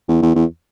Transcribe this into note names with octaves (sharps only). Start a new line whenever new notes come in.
E2
E2
E2